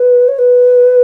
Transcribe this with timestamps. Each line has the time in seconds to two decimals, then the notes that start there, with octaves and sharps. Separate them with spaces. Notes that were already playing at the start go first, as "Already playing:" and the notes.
Already playing: B4
0.28 C#5
0.38 B4